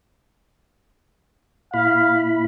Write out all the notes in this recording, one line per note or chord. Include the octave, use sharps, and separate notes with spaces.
A#2 E4 F5 B5